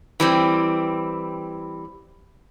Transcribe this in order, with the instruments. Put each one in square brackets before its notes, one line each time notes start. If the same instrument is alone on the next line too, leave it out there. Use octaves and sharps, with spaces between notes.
[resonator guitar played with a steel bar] E3 G3 C4